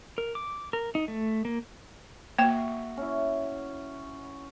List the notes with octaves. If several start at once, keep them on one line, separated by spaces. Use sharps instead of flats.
A#4
D6
A#4
D#4
A3
A#3
A#3 F#4 E5 G5
C#4 E4